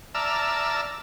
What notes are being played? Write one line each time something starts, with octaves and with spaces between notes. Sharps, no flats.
D5 E5 A5 A#5 E6 F6